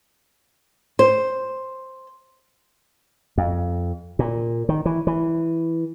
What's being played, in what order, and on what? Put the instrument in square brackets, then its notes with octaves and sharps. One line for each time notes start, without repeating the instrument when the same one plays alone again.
[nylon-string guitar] C5
[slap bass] F2
A#2
D#3
E3
E3